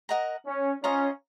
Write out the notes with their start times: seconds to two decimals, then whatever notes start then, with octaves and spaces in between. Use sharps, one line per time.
0.09 A#4 D#5 F#5 A#5
0.47 C#4
0.84 C#4 F4 C5 D#5 A#5